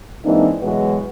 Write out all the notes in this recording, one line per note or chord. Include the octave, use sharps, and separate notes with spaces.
E3 G#3 A#3 C4 D4 D#4
B2 E3 F#3 G#3 F#4 B4